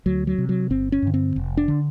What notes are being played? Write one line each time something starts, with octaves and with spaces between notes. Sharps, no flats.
D2 F#3
F#3
C3
F#3
G1 C4
C#4
G2 D3
C4
F1
D4
D3